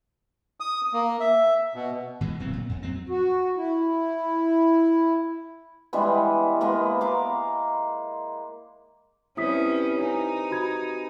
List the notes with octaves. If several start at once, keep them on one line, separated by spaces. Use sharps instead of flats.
D#6
A#3
E5
B2
B2 E3 G#3
D1 F#3 C4
A#2
F2
F#3 C4
F#4
E4
E3 G3 G#3 B3
G#3 A#3 B3
A#5 C6 D6
C3 G3 C#4 E4 B4 D#6 B6
D#4 G#5
F#4 B5 G#6